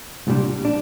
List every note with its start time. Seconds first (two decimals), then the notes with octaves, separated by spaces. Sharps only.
0.27 C2 A#2 G3 D4
0.65 D4